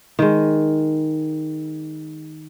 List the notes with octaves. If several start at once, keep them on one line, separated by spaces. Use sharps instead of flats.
D#3 G#3